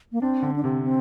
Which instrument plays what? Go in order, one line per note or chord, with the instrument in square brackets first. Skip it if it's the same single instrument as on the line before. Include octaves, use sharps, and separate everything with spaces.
[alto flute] A#3
[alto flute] C4 [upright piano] D4
[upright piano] D3
[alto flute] D4
[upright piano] C3 [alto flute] C4
[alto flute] C4